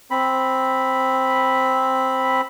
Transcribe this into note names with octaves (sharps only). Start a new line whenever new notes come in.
C4 B5